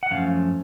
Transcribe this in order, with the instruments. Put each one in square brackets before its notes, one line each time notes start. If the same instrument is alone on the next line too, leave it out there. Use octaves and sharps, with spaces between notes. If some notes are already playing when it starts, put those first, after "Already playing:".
[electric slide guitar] F#5
F#2 F3 A3 C#4 F5